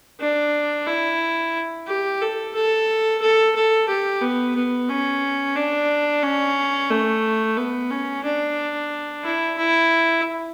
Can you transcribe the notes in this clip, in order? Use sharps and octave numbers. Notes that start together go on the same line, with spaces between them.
D4
E4
G4
A4
A4
A4
A4
G4
B3
B3
C#4
D4
C#4
A3
B3
C#4
D4
E4
E4